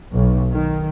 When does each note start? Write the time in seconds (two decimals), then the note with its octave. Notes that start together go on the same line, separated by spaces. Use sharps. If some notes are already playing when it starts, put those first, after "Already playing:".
0.11 B1
0.50 D#3